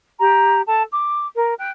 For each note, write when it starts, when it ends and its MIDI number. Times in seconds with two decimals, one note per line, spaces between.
0.19 0.61 67
0.19 0.61 82
0.66 0.82 69
0.66 0.82 81
0.91 1.25 86
1.34 1.53 70
1.59 1.69 79
1.59 1.69 90